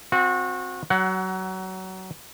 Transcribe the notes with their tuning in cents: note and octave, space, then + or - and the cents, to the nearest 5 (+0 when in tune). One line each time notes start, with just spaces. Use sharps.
C4 +0 F#4 -30
F#3 +25 F#5 +10